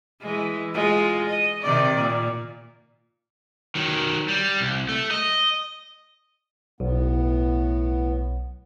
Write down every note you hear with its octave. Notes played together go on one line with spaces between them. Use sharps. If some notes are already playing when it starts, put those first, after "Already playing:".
E3 G#3
G#3 F4
D#5
C3 D#3 D5
A#2
D#3 F#3
G3
C2
A3
D#5
B1 A2 B3